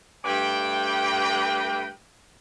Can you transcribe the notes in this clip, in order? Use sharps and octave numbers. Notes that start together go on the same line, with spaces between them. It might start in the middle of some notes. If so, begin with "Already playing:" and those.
G2 A3 B4 D5 G5